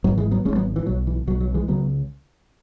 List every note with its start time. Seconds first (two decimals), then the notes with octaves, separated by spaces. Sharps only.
0.04 G#1 G#2 F#3 B3
0.18 E3 G#3
0.31 F#3 B3
0.45 G#1 G#2 G#3 C#4
0.55 F#3 B3
0.76 E3
0.86 B1 B2 F#3
1.07 E3
1.27 B1 F#3
1.30 B2
1.40 F#3
1.54 E3 G#3
1.68 C#2 C#3 F#3 B3